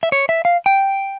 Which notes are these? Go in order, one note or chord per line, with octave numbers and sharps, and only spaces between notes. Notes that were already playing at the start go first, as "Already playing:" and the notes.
E5
C#5
E5
F5
G5